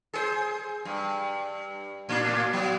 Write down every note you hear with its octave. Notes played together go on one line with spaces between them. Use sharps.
G#4 B4 C5
G2
A2 D4
F#3 B3